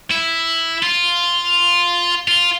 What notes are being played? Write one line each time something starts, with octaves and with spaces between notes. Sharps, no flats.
E4
F4
F4